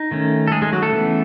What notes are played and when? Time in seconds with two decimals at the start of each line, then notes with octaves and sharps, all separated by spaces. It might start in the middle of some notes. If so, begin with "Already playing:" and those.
Already playing: D#4
0.11 D#3 A3 C#4
0.48 A4
0.52 G#3 G#4
0.62 G#3 G#4
0.72 F#3 F#4
0.82 A3 A4
0.93 C#3 E3 B3